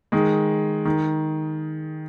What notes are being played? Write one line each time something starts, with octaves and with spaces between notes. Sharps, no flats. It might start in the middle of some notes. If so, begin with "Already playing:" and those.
D#3 G#3
D#3